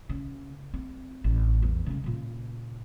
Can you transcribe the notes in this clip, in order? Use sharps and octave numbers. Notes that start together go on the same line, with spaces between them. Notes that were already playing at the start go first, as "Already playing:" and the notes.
C#3
C4
A1
E2
C#3 G#3
A#2 C#3